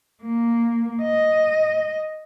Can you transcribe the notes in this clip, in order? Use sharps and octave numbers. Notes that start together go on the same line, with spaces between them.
A#3
D#5